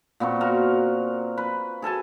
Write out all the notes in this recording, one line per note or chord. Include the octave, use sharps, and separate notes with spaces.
A#2 B3 C4 C#6
F#4 A#4 F5
B4
G#4 A4 G#5 A5